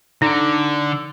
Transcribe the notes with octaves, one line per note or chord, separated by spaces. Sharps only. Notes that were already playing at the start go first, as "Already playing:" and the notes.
D3 D#4